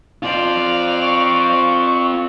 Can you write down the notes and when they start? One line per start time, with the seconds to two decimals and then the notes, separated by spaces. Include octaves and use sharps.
0.23 C4 F4 D5 F5
1.03 C#6